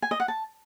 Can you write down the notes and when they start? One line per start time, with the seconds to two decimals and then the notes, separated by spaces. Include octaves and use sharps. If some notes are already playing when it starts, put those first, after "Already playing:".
0.02 G#5
0.11 D#5
0.20 F#5
0.28 A5